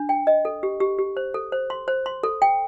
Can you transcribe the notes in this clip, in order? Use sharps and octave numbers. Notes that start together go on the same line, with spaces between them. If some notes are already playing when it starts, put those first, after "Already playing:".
Already playing: D4
G5
D#5
A4
G4
G4
G4
C5
A4
C5
C6
C5
C6
A4
G5